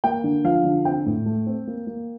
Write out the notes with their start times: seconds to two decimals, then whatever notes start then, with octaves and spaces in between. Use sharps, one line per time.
0.04 A#3 G5
0.24 D3
0.44 F3 F5
0.65 D3
0.85 C4 G5
1.06 A2
1.26 A3
1.47 C4
1.67 A#3
1.87 A#3